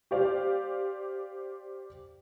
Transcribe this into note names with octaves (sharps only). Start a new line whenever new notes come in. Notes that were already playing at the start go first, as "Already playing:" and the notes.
G4 C5 D5 F5